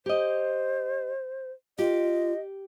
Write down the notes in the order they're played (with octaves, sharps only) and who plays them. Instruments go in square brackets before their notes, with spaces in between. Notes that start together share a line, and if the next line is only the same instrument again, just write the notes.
[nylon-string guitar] G4 D#5 [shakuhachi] C5
[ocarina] F4 [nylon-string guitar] G4 [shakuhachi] D#5